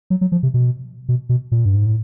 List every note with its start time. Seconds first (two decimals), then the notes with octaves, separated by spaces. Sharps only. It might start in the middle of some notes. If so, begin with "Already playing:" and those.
0.10 F#3
0.21 F#3
0.32 F3
0.43 C3
0.54 B2
1.09 B2
1.29 B2
1.52 A#2
1.65 G2
1.76 G#2
1.86 A2